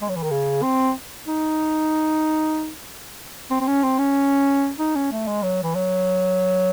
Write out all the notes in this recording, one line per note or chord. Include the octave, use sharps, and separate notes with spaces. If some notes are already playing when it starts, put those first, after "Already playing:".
G#3
F#3
E3
D#3
C#3
C4
D#4
C4
C4
C#4
C4
C#4
D#4
C#4
A3
G#3
F#3
E3
F#3